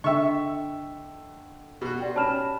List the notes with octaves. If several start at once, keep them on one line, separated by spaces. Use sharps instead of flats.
D3 D#5 E5 G5 C#6 E6
B2 F#4
G4 D5 G5
C#4 A5 B5 F6 E7